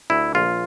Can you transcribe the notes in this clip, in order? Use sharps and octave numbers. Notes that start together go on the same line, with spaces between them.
D2 E4
A#1 F4